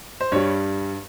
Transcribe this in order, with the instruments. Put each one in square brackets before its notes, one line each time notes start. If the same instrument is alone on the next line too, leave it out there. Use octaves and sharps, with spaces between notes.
[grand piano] C5
G2 G3 C#5